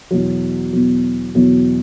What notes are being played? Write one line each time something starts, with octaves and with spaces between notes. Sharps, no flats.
E2 B2 F#3
E2 B2 F#3
E2 B2 F#3